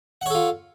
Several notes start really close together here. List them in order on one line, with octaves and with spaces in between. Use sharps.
F#5 C#5 A4 F4